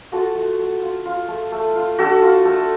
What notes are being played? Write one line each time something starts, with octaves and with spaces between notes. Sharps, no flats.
F4 F#4 A4
A3
A3
F4
F4
A3
A3
F4
D4 F#4 A4
F4
A3